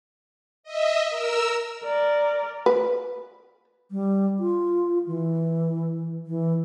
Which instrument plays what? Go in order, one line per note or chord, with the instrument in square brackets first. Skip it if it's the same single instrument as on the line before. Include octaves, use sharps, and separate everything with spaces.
[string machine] D#5 E5
A#4 E6
[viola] A#4 D5
[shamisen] B4
[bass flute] G3
F4
E3
E3